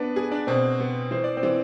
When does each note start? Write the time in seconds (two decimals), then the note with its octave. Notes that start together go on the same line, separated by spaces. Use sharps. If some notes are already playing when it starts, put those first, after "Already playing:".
Already playing: B3 D4 B4
0.16 G#4
0.32 D4 D5
0.47 B2 C4 C5
0.80 B3
1.11 E3 C5
1.24 D5
1.37 C4 C5
1.43 E3